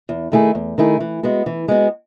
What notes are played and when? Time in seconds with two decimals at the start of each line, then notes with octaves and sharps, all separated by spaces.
0.09 E2
0.32 D#3 A3 E4 G#4
0.55 E2
0.78 D#3 A3 E4 G#4
1.00 E3
1.23 G#3 B3 F#4
1.46 E3
1.68 G#3 B3 F#4